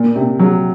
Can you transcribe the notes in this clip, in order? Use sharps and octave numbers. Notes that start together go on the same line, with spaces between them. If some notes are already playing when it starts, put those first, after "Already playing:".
Already playing: A#2
C3
F#3